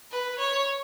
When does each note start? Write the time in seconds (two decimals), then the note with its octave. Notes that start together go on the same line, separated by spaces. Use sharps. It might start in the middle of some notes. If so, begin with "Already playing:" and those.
0.11 B4
0.39 C#5